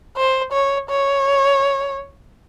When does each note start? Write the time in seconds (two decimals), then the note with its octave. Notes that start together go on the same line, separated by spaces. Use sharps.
0.17 C5
0.52 C#5
0.89 C#5